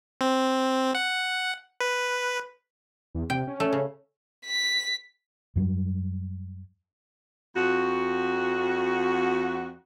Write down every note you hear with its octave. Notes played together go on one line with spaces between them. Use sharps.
C4
F#5
B4
E2
C3 G5
C#4
A3
C#3
B6
F#2 F#3 G3
F2 F#4